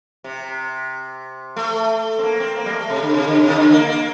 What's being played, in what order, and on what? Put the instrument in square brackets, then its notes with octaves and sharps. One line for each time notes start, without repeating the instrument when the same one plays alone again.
[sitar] C3
A3
C4
A#3
C4
A#3
G3
A3
C3
D3
C3
D3
C3
D#3
D3
A#3
A#3